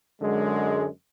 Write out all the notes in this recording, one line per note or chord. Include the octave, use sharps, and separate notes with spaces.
F#2 D3 G#3